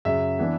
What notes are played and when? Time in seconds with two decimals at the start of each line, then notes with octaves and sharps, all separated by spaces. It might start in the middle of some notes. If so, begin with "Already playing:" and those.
0.05 F#2 C#3 F#3 E5
0.39 E3 B3 D4